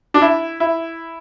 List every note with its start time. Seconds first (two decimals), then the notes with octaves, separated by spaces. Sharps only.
0.14 D4
0.22 E4
0.60 E4